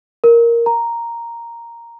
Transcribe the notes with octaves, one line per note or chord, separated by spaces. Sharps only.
A#4
A#5